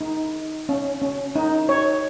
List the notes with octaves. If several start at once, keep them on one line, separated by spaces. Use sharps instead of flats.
D#4
C#4
C#4
D#4
C#5